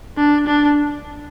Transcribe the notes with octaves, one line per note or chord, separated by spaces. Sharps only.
D4
D4